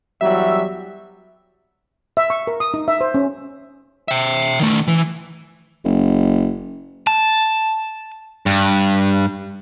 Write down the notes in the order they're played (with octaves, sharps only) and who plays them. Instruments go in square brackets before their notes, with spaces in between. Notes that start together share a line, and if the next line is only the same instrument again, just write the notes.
[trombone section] E2 F#3 G3 [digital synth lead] E5
[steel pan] E5
C#6
A#4
D#6
D#4
E5
C5
C#4
[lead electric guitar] E5 G5
D#3 A3
E3
[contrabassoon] F#1
[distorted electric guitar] A5
G2